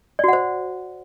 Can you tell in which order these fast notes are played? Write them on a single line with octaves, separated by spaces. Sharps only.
D5 F#4 F#5 C5